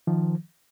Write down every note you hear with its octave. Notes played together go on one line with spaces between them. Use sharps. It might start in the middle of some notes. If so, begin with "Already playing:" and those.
D#3 F3